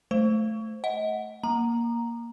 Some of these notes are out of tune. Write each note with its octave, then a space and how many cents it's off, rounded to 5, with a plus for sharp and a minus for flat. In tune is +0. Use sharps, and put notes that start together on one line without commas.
A3 -10 C5 +0
D#5 +30 F#5 +0
A#3 +10 A#5 +0